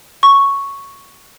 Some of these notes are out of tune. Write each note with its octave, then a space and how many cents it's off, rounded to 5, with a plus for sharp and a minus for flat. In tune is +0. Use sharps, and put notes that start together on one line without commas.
C#6 +0